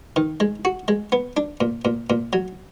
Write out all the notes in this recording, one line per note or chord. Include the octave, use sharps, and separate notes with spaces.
D#3
G#3
F#4
G#3
B3
D4
A#2
A#2
A#2
F#3